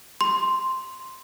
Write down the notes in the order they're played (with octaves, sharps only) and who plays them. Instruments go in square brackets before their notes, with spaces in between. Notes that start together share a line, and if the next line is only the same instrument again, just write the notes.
[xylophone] C6